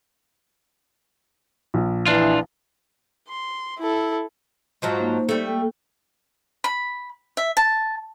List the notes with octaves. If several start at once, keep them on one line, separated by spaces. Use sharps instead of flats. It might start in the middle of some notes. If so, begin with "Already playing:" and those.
A#1
E3 D4 F4
C6
E4 A4
G#2 F3 F#3
A#3 D#4 C5
G3 A3
A#3 A4 G5
B5
E5
A5